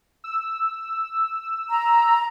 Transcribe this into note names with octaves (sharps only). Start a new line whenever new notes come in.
E6
A#5